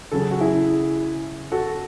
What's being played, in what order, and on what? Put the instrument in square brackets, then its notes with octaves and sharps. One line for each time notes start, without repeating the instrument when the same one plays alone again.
[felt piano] C#3 F#3 C#4 [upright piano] A4
[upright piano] G#4
F#4
E4 G#4
F#4 A4